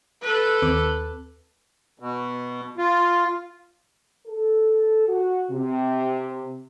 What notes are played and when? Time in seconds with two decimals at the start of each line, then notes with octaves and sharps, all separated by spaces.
0.22 A4 B4
0.62 D#2 C4 D6
1.99 B2
2.78 F4
4.27 A4
5.07 F#4
5.50 C3